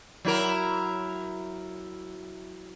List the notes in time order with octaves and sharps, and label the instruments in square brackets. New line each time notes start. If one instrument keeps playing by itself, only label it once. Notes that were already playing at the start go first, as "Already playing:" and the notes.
[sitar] F#3 E4 A#4